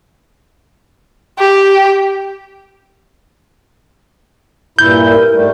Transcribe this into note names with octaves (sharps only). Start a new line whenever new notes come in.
G4
G2 A#2 E4 G6
A#4
G#2 G3 A3